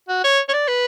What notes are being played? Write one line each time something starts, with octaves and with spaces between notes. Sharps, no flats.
F#4
C#5
C#5
D5
B4